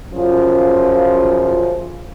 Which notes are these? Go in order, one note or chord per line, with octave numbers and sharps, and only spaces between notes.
F#2 C#3 F3 C#4 F4